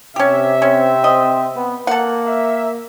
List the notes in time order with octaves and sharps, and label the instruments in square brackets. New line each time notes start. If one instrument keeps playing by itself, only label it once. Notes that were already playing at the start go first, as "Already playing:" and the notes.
[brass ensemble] C3 E5 [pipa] C#4 G4
[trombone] C4 [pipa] C#4
[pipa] D#5
[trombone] B3
[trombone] A#3 [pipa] A4 F#5
[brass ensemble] E5